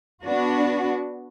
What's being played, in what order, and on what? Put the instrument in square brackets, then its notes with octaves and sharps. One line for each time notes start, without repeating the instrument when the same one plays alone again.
[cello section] B3 D4 F#4